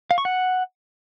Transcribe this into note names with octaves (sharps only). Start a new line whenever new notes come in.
F5
C#6
F#5